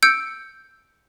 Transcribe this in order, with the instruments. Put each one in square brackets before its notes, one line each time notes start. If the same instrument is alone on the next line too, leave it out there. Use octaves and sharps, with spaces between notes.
[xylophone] E6 G6 C#7 D7